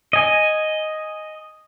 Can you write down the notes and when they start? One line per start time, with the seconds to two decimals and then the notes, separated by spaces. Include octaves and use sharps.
0.13 D#5 G#5